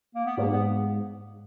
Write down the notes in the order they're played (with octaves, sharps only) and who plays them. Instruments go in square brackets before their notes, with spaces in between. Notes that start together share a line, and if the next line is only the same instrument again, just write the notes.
[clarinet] A#3
B3
[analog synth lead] G#2 [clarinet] A#3
[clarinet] B3